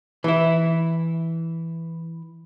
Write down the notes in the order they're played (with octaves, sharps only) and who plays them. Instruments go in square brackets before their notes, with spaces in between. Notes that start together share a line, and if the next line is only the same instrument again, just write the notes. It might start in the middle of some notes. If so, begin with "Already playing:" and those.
[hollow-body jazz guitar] E3 E4